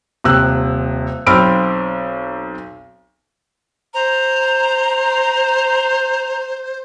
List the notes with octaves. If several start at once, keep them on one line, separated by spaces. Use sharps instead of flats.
D#1 C3 E6 F#6
B1 C4 B5 E6 F6 D7
C5 A#5